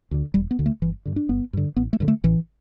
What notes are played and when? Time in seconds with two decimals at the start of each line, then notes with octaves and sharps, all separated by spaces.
0.11 D2 D3
0.34 E1 G3
0.51 B3
0.59 D2 D3
0.66 A3
0.82 G1 E3
1.05 G2 D3
1.16 D4
1.29 G1 B3
1.53 G2 D3
1.76 A1 B3
1.93 A3
2.00 G2 D3
2.08 A3
2.24 A1 E3